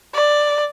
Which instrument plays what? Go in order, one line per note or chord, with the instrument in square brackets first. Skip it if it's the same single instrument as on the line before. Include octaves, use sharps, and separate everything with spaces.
[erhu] D5